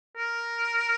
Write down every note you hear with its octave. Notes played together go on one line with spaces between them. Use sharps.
A#4